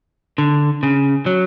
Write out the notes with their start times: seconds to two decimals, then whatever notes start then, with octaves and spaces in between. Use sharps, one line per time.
0.38 D3
0.83 C#3
1.26 F#3